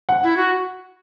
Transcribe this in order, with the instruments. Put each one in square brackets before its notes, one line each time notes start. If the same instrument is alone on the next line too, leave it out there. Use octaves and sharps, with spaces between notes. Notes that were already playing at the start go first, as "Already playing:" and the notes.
[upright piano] F#5
[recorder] E4
F#4